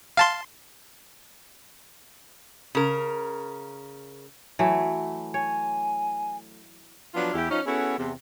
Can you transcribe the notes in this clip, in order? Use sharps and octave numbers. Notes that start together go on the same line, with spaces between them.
F5 A5 C6
C#3 A#4
E3 F#3 A3
C#5 G#5
F3 F#3 B3 D4 F4
E2 E4 G4
F3 C#4 D#4
B3 C#4 E4 F#4 G#4 A4
E2 C3 C4